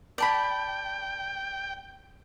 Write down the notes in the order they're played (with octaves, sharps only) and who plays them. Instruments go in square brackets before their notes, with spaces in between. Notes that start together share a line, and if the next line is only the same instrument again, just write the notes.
[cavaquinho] D5 A5 B5 [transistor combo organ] G5